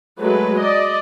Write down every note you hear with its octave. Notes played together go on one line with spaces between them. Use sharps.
F#3 G#3 A3 B4
D5 D#5